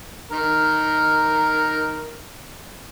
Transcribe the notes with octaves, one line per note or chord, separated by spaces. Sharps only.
D#3 A#4